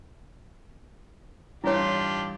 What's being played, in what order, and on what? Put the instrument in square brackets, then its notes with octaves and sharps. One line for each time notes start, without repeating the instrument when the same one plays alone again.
[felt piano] A1 G2 C6 [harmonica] D4 F4 G4 [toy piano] E4 C#5